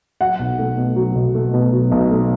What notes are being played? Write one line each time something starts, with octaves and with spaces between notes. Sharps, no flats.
F#3 F#5
B1
A3
B2
F#3
B1
A3
B2
F#3
B1
A3